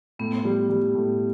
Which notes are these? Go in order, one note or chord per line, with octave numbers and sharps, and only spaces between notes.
A2 B3
G3
G3
A2